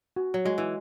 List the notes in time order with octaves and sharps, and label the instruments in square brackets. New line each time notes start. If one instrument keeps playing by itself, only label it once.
[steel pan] F#4
[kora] F#3
[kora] G#3 [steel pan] F#4
[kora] E3